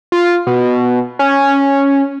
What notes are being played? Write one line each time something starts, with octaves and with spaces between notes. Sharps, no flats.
F4
B2
C#4